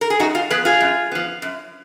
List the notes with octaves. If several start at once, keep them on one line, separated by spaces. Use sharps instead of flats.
A#4
G#4
F#2 D#4 F#4
F4
F3 B3 G#4 B4
F4 G#4
F#2
F3 B3
F#2